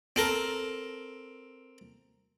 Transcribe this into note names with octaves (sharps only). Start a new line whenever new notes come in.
C4 A4 A#4